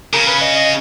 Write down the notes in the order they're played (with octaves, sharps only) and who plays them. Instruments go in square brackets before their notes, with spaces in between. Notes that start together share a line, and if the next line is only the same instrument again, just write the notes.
[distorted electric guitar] C#3 [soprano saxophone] A#4
[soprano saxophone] B4
D#5
D#5